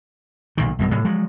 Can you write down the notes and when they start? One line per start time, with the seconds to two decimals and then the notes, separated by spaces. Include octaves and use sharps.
0.58 B1 A#2 D#3
0.79 B1 G2 B2
0.91 A2 C3 F#3
1.05 F3 F#3 G#3